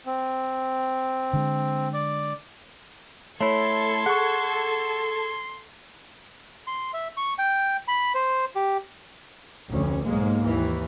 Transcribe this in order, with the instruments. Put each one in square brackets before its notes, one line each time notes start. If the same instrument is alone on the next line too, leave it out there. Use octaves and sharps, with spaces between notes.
[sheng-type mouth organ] C4
[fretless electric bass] D3 G#3
[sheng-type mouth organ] D5
[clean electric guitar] A3 E4 [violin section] A4 G#6 [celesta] C#5 [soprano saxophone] C6
[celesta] G#4 C#6 [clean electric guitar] F#5
[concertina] C6
E5
C#6
G5
B5
C5
G4
[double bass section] F1 D2 C#4
B1 G#2 G#3 A#3
D#2 E3